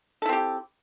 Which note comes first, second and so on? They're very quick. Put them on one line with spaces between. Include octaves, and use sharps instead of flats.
A4 E4 C4 G4